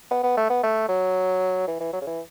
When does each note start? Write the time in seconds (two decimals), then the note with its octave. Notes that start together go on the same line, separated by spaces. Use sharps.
0.11 B3
0.24 B3
0.37 A3
0.50 B3
0.63 A3
0.89 F#3
1.68 E3
1.80 E3
1.93 F#3
2.01 C#3
2.07 E3